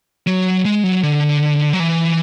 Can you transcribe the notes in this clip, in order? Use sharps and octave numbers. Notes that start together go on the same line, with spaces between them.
F#3
G#3
F#3
D3
F#3
E3